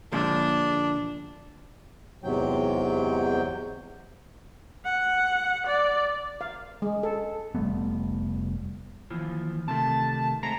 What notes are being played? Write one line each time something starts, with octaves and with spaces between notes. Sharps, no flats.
A#2 D3 F3 D4
E2 G#2 C3 F#3 G5
F#5
D5
F5
G#3
A4
F1 G3 A3 B3
D#2 E3 F3
C3 D#3 A3 A5
G#3 A3 C4 A#5